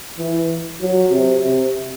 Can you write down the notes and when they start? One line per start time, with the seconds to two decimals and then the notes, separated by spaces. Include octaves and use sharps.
0.18 E3
0.81 F#3
1.11 C3
1.42 C3